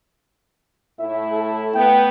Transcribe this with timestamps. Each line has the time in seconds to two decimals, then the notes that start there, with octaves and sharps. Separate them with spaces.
0.99 A2 E4 E5
1.32 A4
1.74 A3 B3 G5